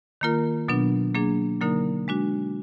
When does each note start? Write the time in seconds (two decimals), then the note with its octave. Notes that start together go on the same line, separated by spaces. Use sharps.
0.21 D#3 A#3 F4 A#4
0.68 B2 F#3 B3 D4
1.14 F#3 A#3 D4 G#4
1.61 D3 F#3 A#3 D#4 A#4
2.08 G#3 D4 F#4